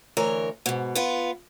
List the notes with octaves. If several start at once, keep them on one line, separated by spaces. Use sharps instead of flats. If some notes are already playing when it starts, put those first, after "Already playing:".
D2 E3 A#4 C#5
G#2 B2
B3 F4